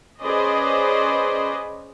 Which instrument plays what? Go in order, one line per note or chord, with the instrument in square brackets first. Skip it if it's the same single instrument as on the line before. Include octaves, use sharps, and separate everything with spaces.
[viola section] C#4 G#4 B4 C5 D5 D#5